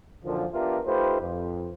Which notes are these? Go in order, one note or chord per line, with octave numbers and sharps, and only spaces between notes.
F#2 A#2 D3 D#3 F3
B3 D4 F4 G4 A#4 E5
A3 D#4 F4 G4 B4 C5
F2